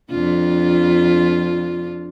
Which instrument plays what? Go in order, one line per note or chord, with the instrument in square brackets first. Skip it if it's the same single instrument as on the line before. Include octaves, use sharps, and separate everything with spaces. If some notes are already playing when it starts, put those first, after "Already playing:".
[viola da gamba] F2 D4 F4